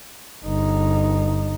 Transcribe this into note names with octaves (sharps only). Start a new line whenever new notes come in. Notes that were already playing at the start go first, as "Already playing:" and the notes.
G1 D#4